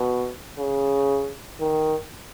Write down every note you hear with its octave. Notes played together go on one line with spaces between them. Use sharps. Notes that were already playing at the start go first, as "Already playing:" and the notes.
Already playing: B2
C#3
D#3